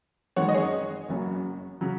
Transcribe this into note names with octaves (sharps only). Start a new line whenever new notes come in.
F#2 D#3 G#3 C#5 F#5
D#5
G#4 C#5
F#1 F#2 F#3
C#3 F#3